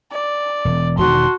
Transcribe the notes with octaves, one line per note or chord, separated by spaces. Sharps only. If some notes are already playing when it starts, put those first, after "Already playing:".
D5
E1
E1 D#3 F#4 A5 C6